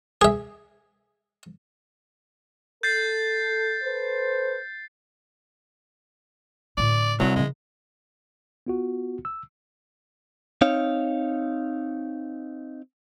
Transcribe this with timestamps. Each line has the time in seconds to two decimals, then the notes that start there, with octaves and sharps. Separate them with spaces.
0.21 G#4 E5
2.83 A4 G6 A6 C7
3.82 A4 B4 C5
6.77 A2 D3 D5
7.20 C2 D#3 F#3 D4
7.36 C#3 F3 G#3
8.67 B3 F4 F#4
9.25 E6
10.61 C4 D#4 C#5 F5